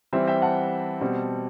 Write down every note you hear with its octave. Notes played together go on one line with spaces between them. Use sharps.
E3 G3 C4 C5 E5
E5 G5
F#5 A5
B2 G3 C4